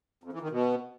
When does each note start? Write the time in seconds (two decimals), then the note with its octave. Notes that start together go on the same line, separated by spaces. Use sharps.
0.24 F2
0.33 E3
0.42 D#3
0.51 B2